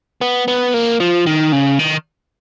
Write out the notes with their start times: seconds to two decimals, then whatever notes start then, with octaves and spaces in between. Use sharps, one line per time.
0.21 B3
0.48 B3
0.74 A#3
1.00 F3
1.26 D#3
1.52 C#3
1.79 D#3